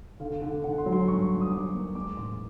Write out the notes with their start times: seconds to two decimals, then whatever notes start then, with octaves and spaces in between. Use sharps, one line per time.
0.20 D3 F5
0.42 D3
0.64 D3 F#5
0.78 C6
0.86 F#3
0.93 C6
1.07 G2 C#6
1.30 G2
1.41 D#6
1.51 F#3 D6
1.73 A#3
1.95 G#3 D6
2.17 A1 C6